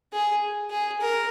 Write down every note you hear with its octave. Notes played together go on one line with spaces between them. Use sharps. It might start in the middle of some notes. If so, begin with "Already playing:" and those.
G#4
G#4
A#4